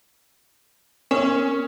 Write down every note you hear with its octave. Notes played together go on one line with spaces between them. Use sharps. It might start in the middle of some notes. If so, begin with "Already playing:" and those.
B3 C#4 A#4 C#6